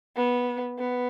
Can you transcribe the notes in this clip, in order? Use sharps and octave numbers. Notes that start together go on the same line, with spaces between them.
B3
B3